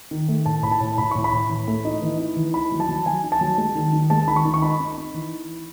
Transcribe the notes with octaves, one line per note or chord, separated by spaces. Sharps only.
D#3
A3
A2 A5
A2 B5
A5
A2
A2 B5
A2 C#6
B5
A2
E3
A3
D#4
E3
D#4
E3
D#4 B5
F#3
A5
F#3
F#3 G#5
D#4
A5
F#3
G#3
D#3
D#3
G#3 A5
D#3 B5
C#6
D#3
C#6
D#4 B5
D#4
D#4
E3